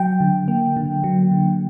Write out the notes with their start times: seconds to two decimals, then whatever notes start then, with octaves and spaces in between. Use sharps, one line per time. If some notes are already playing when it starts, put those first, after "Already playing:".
Already playing: F#3 G5
0.20 D3
0.48 A#3
0.77 D3
1.04 F#3
1.32 D3